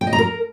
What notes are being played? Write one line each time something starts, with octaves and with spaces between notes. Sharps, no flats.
G5
D#5
A#5
A#4